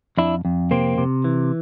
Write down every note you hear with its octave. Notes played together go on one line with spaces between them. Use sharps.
F2 D4 E4
F2
C3 A#3 C4
C3
E3